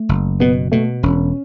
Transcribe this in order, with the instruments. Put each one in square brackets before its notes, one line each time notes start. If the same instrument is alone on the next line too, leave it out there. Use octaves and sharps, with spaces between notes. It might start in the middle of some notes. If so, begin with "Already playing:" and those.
Already playing: [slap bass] A3
F#1
[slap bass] B2 [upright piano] B3
[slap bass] B2 [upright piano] A3
[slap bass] E1 [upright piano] C#4